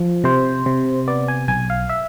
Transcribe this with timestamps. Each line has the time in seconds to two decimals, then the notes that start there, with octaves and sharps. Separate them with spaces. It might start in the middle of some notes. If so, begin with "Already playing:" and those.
Already playing: F3
0.24 C3 C5
0.66 C3
1.08 B3 D5
1.28 G#5
1.48 B1 G#5
1.70 F5
1.89 E5